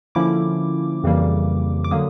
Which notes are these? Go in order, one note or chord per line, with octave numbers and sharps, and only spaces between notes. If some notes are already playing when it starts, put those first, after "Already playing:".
D3 F3 A#3 C#4 E4 D6
F2 C#3 E3 G3 A#3
D6
D3 F#3 A#3 D#6